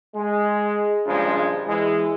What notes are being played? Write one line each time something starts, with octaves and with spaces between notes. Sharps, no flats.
G#3
C#2 G2 A#2 F3 G#3
E3 G#3